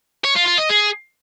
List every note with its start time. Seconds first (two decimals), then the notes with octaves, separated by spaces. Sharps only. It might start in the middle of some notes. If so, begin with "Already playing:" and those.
0.25 C#5
0.36 F4
0.47 F4
0.59 D#5
0.70 G#4